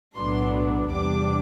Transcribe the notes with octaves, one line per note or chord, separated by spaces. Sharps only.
B1 A2 F#3 B3 D4 C6
E2 C3 G3 D4 D6